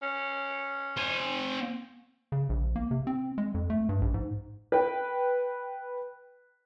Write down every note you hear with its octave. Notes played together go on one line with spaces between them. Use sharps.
C#4
C4 G#5
C#3
A#1
A#3
C3
C4
G#3
F2
A3
G2
A#1
G#2
B4 G5